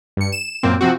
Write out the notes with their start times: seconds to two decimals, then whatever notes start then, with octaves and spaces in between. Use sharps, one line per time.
0.17 G2 C#7
0.32 E7
0.63 F#2 A#2 A#3 C4
0.81 C3 F3 C4 F#4